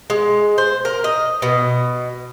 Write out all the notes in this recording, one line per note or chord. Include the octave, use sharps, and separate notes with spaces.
G#3
C5
A#4
D#5
B2